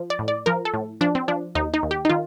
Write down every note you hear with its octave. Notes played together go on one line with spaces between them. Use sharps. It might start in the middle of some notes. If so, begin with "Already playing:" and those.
Already playing: F3
D5
A2
D5
F3 A#4
A4
A2
F3 D4
C4
F3 D4
D#2 D#4
D#4
D#2
G4
D#4
D#3 F4